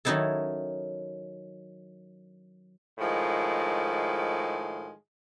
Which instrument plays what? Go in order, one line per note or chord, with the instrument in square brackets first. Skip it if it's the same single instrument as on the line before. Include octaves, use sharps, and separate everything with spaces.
[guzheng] D#3 F#3 C#4 D#4 E4 A4
[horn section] A2 D#3 F3 G#3